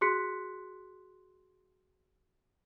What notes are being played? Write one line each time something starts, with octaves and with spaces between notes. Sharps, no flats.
F#4 G#4 C6 F#6 B6 C#7